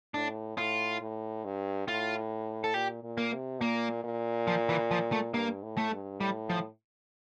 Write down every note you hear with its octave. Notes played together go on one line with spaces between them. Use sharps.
A2 D4
A2 F4
A2
G2
A2 F4
A4
A#2 G4
A#2
A#3
C3
A#2 A#3
A#2
F3
E3
F3
A3
G2 A#3
A2
A3
G2
A2 G3
F3